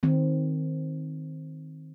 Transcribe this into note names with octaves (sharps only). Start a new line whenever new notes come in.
D#3 C4